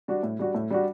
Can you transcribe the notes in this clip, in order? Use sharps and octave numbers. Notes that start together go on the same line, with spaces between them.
G3 D4 F#4
A2
G3 D4 F#4
A2
G3 D4 F#4